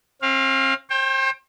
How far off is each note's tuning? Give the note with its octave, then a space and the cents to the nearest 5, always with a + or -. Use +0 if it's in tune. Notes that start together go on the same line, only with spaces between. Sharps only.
C4 +40 F5 +0
C5 +40 G5 +15